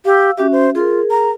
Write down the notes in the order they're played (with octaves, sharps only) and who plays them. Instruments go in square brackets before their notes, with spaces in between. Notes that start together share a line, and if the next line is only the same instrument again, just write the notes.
[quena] G4 [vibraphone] F5 E6
[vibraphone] C#4 F#4 E5 [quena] G4
[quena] C5
[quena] F4 [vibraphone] G#4 A#4
[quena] A#5